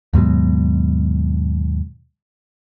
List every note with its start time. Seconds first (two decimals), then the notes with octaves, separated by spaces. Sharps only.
0.13 D#2 G#2 B2 F#3